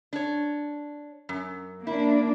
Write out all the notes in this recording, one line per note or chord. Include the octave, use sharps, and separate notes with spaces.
D4 C#5
F#2
A#3 D4 E4